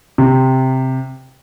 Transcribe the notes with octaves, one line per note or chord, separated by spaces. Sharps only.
C3